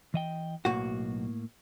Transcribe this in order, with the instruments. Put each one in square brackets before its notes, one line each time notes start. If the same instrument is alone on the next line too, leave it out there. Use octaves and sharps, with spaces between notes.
[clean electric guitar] E3 D#5 G5
[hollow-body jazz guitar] B1 F#4 [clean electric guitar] A2 A#3